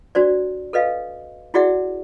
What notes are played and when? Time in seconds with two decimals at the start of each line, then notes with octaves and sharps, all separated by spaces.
0.15 D4 F#4 C5 D5
0.73 A4 B4 D#5 F5
1.54 E4 F#4 G#4 D5 E5 F#5